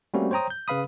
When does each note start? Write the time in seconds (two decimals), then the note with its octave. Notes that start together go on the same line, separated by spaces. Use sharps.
0.14 G3 A3 A#3 C4 C#4 F#4
0.31 C5 C#5 G5 A#5 D#6
0.50 G6
0.68 C#3 B4 F5 B5 D#6